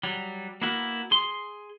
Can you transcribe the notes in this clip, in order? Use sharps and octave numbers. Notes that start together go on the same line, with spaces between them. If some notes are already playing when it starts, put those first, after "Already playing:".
F#3 G3
A#3 B3 E4 F#4 A#4
G#4 C6